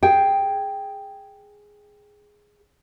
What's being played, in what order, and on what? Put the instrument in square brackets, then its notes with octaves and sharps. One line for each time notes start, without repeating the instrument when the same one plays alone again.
[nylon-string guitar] G#4 G5